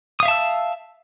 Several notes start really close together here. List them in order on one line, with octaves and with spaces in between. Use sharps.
D#6 F5 E5 A5 E6